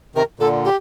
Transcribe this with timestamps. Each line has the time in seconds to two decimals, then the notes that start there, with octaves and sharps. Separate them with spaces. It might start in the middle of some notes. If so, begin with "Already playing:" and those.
0.15 C3 D#3 A#4
0.39 A#2 D3 A4
0.65 G4